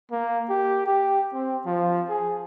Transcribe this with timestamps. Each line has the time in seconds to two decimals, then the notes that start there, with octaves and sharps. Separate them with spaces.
0.11 A#3
0.49 G4
0.86 G4
1.33 C4
1.66 F3
2.09 G#4